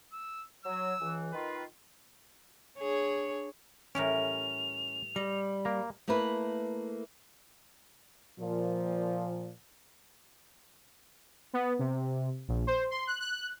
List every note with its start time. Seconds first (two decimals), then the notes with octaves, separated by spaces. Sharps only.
0.13 E6
0.65 F#3 E6
1.00 C#2 E3
1.33 D#3 F4 B4
2.78 D4 G#4 C#5
3.95 A2 E3 G3 C#4 A#4 F7
5.16 G3 D#5
5.65 A#3 A#5
6.08 A3 A#3 E4 A#4 B4
8.40 A#2 F3
11.53 B3
11.79 C3
12.48 A#1
12.67 C5
12.91 C6
13.07 F#6
13.20 F#6